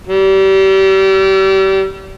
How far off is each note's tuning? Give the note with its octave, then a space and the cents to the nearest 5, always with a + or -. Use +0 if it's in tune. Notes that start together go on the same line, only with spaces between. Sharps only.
G3 -30